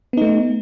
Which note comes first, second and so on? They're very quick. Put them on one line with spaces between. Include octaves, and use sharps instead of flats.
B3 D#4 A3